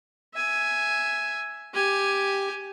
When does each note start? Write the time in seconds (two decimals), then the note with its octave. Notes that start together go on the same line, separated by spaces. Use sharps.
0.34 E5 G#5
1.74 G4 G#5